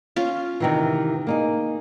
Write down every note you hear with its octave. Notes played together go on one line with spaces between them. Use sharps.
C#4 F4
C3 D#3 E3
A#3 D#4 G#4